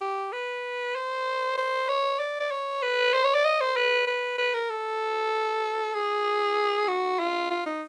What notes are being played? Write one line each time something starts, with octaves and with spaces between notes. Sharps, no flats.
G4
B4
C5
C5
C#5
D5
D5
C#5
B4
C5
C#5
D5
D#5
C5
B4
B4
B4
A#4
A4
G#4
F#4
F4
F4
D#4